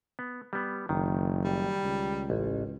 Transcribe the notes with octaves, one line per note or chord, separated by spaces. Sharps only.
B3
G3 B3
F#1 D#3
G3
C#2
A1